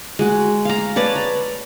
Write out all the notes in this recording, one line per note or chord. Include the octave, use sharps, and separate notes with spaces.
G#3 F#4
F5 A#5
B4 C#5 D5 A5
A#5